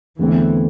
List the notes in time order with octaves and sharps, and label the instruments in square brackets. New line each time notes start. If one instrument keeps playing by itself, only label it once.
[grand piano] E2 D3 A3 C4 [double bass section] E3